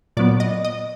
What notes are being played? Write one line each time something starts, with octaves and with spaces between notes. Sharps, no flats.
A#2 F#3 B3 D5
D#5
D#5